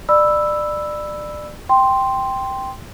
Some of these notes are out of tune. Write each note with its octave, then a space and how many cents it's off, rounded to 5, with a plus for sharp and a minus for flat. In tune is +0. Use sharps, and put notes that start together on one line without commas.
D5 +25 B5 +0 E6 +0
G5 +0 C6 +0